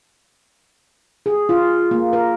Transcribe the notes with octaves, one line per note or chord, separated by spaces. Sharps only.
G#4
F4
A#3
A#4